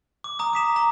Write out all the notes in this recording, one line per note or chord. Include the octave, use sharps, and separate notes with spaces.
D6
A#5 D#6
D6 B6 E7
A#5